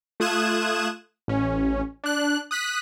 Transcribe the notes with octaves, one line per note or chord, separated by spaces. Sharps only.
A3 F4 D#6 F#6 G#6 E7
A1 C#4
D4 F#6
D#6 F#6 B6